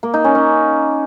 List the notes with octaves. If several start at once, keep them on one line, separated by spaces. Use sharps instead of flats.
A#3
D#4
C#4
C#4